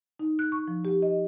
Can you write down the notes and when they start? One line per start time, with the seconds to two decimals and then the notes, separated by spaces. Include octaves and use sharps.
0.19 D#4
0.39 F#6
0.52 C#6
0.68 F3
0.85 G4
1.02 D#5